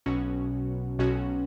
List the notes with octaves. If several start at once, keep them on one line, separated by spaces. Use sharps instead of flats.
B1 B2 F#3 C#4 F#4
B1 B2 F#3 C#4 F#4